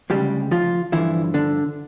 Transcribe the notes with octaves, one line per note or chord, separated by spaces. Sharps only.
D2 C#3 F3 G3 G#3 G4
F3 F4
G2 D3 E3 F3 E4
D3 D4